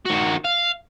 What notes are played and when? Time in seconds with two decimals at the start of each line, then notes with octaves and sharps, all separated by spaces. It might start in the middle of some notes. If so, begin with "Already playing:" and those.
0.05 D#3 F#4
0.45 F5